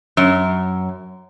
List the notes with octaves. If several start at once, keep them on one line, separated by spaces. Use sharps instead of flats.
F#2